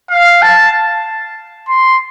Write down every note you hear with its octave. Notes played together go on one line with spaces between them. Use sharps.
F5
A5
C6